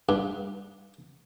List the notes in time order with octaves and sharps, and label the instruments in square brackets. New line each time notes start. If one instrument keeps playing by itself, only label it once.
[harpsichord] G2